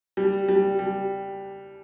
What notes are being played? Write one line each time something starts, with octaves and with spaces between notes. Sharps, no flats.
G3
G3
G3